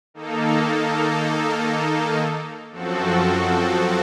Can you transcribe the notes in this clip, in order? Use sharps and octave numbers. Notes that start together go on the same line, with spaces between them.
D#3 A#3 D#4 A4
F#2 F3 C4 F#4 A4